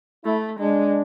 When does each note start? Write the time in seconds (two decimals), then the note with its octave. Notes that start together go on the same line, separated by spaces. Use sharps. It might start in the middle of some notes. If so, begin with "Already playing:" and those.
0.25 A3 E4
0.60 G#3 D4